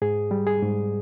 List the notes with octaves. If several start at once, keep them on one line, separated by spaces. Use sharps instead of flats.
G#2 G#4
G3
G#4
G#2